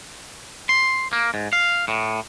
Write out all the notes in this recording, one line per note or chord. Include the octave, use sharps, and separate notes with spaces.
C6
A#3
G#2
F5
A2